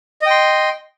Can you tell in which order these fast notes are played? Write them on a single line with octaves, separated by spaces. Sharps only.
D#5 G5 C6